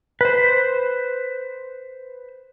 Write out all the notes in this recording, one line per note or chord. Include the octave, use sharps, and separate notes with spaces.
B4 C5